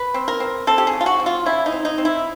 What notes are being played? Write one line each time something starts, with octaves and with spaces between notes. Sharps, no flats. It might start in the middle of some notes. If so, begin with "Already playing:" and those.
Already playing: B4
C4
A#4
C4
C4 A4
G4
G#4
C#3
F4
F#4
C4
F4
C#3 E4
D#4
C4
D#4
C4
E4